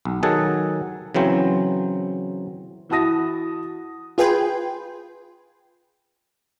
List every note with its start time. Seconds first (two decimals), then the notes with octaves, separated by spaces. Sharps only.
0.05 B1
0.23 D#3 F#3 G#4 A4 F#5 A5
1.14 C#3 E3 F#3 C4 C5
2.89 E3 E4 F#4 A5 D#6 A#6
4.18 F4 G#4 B4 G5 G#5 C6